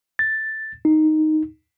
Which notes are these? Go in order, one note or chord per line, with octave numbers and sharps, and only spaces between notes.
A6
D#4